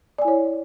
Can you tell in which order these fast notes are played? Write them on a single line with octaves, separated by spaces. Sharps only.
D5 G#5 E4 C#5